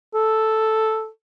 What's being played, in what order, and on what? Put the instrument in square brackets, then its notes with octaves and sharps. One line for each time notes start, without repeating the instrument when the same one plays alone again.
[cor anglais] A4